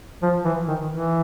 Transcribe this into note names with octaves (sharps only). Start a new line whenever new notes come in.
F3
E3
D#3
E3